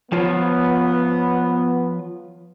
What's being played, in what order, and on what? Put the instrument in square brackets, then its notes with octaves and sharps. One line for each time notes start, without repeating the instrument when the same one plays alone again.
[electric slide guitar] F3 F4 C#5 [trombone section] B3